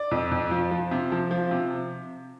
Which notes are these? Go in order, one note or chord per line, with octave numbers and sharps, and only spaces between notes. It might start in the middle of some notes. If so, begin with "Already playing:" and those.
Already playing: D5
F2
F2
F3
F3
C3
F3
F3
C3